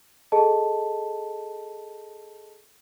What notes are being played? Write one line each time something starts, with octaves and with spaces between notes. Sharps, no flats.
G#4 A4 D#5 A5